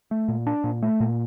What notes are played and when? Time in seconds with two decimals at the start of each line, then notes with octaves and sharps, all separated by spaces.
0.11 A3
0.28 A#2
0.47 D4
0.64 A#2
0.83 A3
1.00 A#2